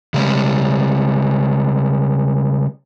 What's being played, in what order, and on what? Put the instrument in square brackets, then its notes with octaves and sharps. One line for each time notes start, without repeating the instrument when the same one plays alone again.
[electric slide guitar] C#3 G3 G#3 C#4